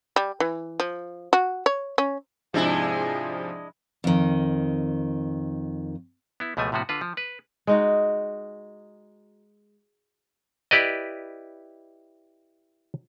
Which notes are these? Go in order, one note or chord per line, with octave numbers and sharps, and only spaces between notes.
G3
E3
F3
F#4
C#5
C#4
G#2 C3 F3 G#3 D4 E4 G#4
F2 D#3
B3 E4
C#2 B2 F3 A3 G#5
A2 C3 F3 B3 F#4
D3 F4 B4
F3
B4
G#3 D#4 F#4
E4 G4 B4 D5 D#5